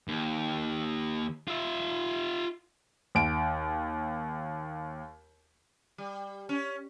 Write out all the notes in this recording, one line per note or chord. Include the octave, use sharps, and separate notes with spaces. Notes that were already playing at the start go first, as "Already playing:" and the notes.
D#2
F4 E5
D#2 D7
G3
C#4